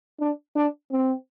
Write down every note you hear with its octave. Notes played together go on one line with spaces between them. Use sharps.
D4
D4
C4